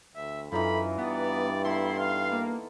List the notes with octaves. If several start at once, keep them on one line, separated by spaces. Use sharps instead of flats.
D2 E5
F#2 E3 D#4 F4 A4 B5
G2 B3 D5
B3 E4 A4 C6
F5
A#3